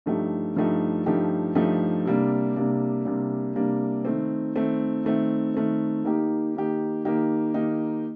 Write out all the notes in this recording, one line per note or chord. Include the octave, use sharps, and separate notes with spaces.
G2 F3 A3 D#4 G4
G2 F3 A3 D#4 G4
G2 F3 A3 D#4 G4
G2 F3 A3 D#4 G4
C3 G3 A#3 D4
C3 G3 A#3 D4
C3 G3 A#3 D4
C3 G3 A#3 D4
D#3 A3 C4
D#3 A3 C4
D#3 A3 C4
D#3 A3 C4
D#3 A#3 D#4 G4
D#3 A#3 D#4 G4
D#3 A#3 D#4 G4
D#3 A#3 D#4 G4